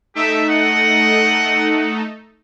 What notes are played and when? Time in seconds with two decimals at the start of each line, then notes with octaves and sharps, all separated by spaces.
0.15 A3 D#4 G4 A4 E5
0.49 D#5 F#5